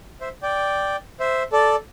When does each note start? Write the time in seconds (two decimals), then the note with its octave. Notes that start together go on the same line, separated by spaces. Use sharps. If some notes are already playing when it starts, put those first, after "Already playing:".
0.21 C5 E5
0.42 D5 G5
1.20 C5 E5
1.52 A4 D5